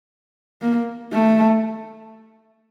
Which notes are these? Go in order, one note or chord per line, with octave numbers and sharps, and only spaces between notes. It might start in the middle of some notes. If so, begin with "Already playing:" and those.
A#3
A3